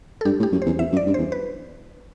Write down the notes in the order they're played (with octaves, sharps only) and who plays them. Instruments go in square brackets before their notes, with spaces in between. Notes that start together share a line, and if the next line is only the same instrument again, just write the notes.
[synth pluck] A4
[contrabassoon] G2 [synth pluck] G4
[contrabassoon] A2
[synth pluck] G4
[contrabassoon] F#2
[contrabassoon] E2 [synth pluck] C5
[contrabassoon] E2 [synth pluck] E5
[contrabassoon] F#2
[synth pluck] D5
[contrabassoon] G2
[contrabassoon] E2 [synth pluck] C5
[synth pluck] B4